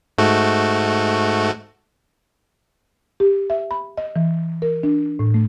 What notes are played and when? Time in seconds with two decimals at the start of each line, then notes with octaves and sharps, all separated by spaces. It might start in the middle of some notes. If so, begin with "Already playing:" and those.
0.18 G#2 A3 F#4
3.20 G4
3.50 E5
3.71 B5
3.97 D#5
4.16 E3
4.62 A#4
4.83 D4
5.19 A2
5.34 A3